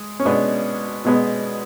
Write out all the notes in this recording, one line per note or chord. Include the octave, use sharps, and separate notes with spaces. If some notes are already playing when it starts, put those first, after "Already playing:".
Already playing: G#3
C#4
B2 G#3 B3 D4
B2 G#3 B3